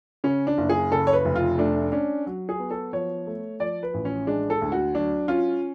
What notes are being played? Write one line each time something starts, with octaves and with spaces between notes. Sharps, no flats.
C#3 C#4
D4
F#1
G#4
C#3 A4
C#5
B4
F1
F4
A3 D4
C#4 D4
F#3
G#4
B3
A4
F3 C#5
A3
F3 D5
B4
A1
C#4
G#3 D4
A4
D2
F#4
F#3 D4
C#4 F4